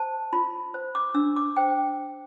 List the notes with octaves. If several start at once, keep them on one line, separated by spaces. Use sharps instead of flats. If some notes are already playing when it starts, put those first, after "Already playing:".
Already playing: C5 A5
F4 B5
C5
D6
D4 E6
D6
C5 G5